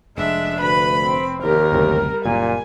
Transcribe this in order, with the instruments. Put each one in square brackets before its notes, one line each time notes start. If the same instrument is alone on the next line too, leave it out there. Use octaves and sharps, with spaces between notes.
[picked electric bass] F1 [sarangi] G#3 [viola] D4 E5
[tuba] D2 [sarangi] B4 [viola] B5
[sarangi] C4
[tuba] D#2 [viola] G4 [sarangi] A#4
[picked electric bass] F#1 D2 C3 [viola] G3
[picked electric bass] F#1 A#3 [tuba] A#2 [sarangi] G#5